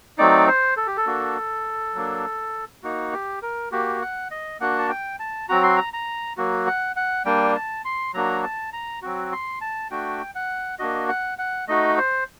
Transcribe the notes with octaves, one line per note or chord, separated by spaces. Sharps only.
F#3 A3 C4 D#4 D5
C5
A4
G4
A4
A#3 D4 F#4
F#3 A#3 D4
A#3 D#4 F#4
G4
A#4
A#3 F#4 G4
F#5
D#5
A#3 D4 F#4 F#5
A5
G5
A5
F#3 C4 F#4 A#5
C6
A#5
A#5
F#3 A#3 F#4
F#5
F#5
G3 A#3 D4 G5
A5
C6
F#3 A#3 D4 F#4 A#5
A5
A#5
F#3 C4 F#4
C6
A5
A3 D4 F#4 G5
F#5
A#3 D4 F#4 D#5
F#5
F#5
A3 D#4 F#4 D#5
C5